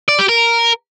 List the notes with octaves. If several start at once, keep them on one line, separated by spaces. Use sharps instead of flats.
D5
G4
A#4